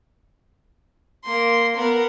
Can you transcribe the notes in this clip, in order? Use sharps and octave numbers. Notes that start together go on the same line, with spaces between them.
A#3 C6
B3 A#4